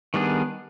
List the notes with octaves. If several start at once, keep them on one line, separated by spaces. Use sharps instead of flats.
D#3 G3 B3 D4 G#4